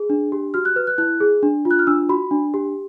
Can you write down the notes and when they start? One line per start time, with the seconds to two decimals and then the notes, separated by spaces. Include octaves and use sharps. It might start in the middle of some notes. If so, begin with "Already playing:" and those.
Already playing: G#4
0.10 D4
0.32 G4
0.54 F#4 F6
0.65 F#6
0.76 B4 F6
0.87 F#6
0.98 E4 F#6
1.21 G#4
1.43 D4
1.65 F4
1.71 F#6
1.79 F6
1.87 D4 E6
2.09 F#4 B5
2.31 D4
2.54 G4